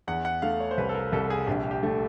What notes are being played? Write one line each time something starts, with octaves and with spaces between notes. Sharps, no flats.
E2 F#5
F#5
A3 F5
C#5
C5
C2 B4
A4
A#4
C2 A4
G#4
A#1 G4
G4
A3